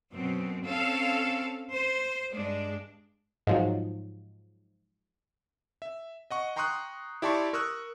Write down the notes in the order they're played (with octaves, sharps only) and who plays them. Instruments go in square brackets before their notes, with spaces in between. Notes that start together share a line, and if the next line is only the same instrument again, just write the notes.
[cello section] F#2 B2 C4
C4 C#4 A4 F5
C5
G2 G#3 D4
[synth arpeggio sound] G#2 F3 F#3
[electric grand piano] E5
D#5 F#5 C#6
G5 A#5 C6 C#6 D#6 F#6
E4 G4 D5 A5 C6 C#6
A#4 C#6 D#6 E6 F#6